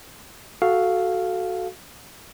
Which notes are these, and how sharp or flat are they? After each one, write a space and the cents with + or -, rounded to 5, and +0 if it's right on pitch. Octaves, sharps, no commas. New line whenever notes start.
F#4 +0 A4 -15 F5 +0